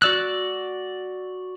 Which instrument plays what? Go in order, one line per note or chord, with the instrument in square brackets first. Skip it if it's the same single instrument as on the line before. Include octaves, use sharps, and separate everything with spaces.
[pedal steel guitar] F#4 D5 E6 F#6